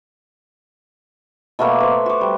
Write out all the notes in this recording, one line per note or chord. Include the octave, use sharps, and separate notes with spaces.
B2 A3 A#3 B4
B4 C5
F#4 D6
G3